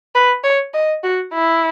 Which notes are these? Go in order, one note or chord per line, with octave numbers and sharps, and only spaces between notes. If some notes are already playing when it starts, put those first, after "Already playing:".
B4
C#5
D#5
F#4
E4